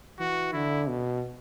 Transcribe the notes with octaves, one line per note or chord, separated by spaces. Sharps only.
E3 F#4
D3 E4
B2